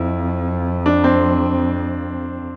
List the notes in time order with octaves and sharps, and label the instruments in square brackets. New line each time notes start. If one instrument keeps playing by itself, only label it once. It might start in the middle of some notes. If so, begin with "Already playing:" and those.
Already playing: [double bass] F2 [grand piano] E4
[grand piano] D4
C4